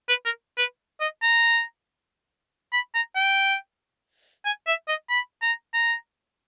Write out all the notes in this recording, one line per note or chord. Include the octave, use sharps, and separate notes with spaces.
B4
A#4
B4
D#5
A#5
B5
A#5
G5
G#5
E5
D#5
B5
A#5
A#5